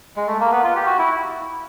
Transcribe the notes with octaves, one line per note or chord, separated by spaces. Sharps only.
G#3
A3
A#3
B3
F4
G4
F#4
E4